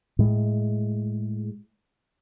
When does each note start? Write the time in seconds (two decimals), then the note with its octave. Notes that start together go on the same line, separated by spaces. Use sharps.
0.19 A2 G#3